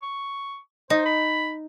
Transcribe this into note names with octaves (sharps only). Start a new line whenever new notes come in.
C#6
D#4 C5
B5